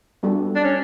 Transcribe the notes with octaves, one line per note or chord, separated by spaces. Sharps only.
G3 B3 D4 F#4 A4
D4
C#4